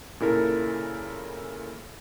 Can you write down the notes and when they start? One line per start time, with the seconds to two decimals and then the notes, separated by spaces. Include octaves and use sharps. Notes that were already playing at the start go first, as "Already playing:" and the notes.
0.20 A#2 C#3 E4 A4 A#4